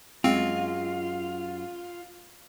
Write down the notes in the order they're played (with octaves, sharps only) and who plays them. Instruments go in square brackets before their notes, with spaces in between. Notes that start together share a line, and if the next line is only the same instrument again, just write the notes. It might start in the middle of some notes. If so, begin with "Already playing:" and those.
[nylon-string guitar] F#2 G#3 [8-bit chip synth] C4 [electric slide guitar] F4